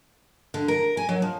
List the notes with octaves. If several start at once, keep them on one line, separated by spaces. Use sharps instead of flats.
D3
A#4
G#5
F#3
F3